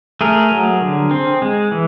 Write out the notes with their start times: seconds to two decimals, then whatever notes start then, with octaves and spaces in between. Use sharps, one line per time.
0.21 A3 G#4 A#4
0.51 F#3
0.81 D3
1.11 C4
1.42 G#3
1.72 E3